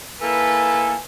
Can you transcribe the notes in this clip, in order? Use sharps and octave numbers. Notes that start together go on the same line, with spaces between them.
A#3 E4 A4 B4 G#5